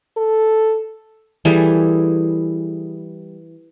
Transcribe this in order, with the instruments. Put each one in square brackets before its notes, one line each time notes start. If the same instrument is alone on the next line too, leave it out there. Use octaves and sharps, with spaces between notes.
[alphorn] A4
[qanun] E3 G3 G#4 A4